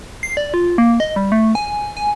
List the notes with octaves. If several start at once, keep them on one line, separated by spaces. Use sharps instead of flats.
C7
D5
F4
A#3
D#5
G3
A3
G#5
G#5